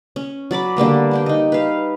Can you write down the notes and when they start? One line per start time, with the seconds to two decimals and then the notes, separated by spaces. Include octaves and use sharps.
0.16 C#4
0.51 F#3 D5 B5 D6
0.77 D3 G3 A#3 B3
1.11 A#3 D4 G5
1.26 D#4 D#5
1.52 B4 F5